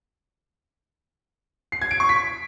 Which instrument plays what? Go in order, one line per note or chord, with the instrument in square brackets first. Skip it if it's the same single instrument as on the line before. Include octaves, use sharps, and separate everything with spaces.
[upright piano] C7
G#6
D7
C#6
B6